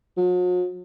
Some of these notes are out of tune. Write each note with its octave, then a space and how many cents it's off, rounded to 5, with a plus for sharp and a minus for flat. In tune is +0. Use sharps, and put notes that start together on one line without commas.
F#3 -45